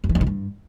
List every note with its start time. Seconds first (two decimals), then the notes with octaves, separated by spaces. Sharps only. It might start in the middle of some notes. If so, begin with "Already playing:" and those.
0.04 F#2
0.09 E3
0.15 F2
0.21 D#3
0.27 G2